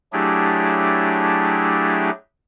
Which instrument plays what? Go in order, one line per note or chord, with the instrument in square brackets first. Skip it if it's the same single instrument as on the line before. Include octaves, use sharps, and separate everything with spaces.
[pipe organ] F#3 A3 D4 E4 G4 G#4